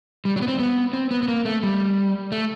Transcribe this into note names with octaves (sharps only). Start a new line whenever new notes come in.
G3
F#3
B3
C4
B3
C4
B3
B3
A#3
A3
G3
A3